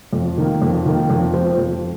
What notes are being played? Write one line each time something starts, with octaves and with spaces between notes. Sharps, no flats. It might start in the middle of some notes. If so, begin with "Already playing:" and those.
F2
D#3 A#3
F2
D#3 A#3
F2
F3 C4
F2